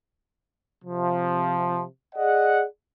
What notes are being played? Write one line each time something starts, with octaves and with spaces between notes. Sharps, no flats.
C3 F3
G#4 D5 D#5 F#5